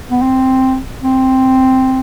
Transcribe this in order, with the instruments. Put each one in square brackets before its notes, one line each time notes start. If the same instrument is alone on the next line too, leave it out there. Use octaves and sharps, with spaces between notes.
[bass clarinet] B3
C4
C4